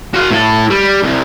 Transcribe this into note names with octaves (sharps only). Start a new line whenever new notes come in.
F#4 F5
A2 A4
G3
C2